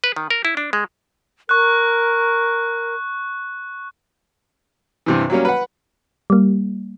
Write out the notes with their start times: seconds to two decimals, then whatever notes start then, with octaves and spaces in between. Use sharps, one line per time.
0.04 B4
0.16 D#3
0.30 A#4
0.45 E4
0.57 D4
0.73 G#3
1.49 A#4 C#6 F#6
5.06 G2 C3 E3
5.30 F#3 G3 A#3 C#4
5.45 B4 F#5
6.30 G3 A#3